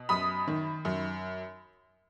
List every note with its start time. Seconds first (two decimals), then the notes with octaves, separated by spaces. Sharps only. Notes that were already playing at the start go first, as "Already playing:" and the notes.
Already playing: B2
0.09 F#2 B5 D#6
0.48 D#3
0.85 F#2